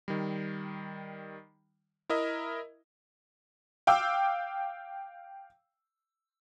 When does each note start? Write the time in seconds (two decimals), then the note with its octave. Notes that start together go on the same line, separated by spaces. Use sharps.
0.08 D#3 G3
2.10 E4 A#4 D#5 E5
3.87 F5 G5 D6 E6